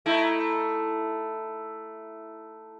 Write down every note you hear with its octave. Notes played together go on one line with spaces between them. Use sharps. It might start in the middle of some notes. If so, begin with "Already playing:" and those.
A3 D#4 E4